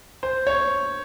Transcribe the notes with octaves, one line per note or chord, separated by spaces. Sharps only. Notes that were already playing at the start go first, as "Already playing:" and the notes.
C5
C#5